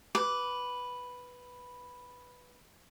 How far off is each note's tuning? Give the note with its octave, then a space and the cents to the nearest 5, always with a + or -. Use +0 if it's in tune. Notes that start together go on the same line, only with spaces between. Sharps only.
B4 +0 D6 -10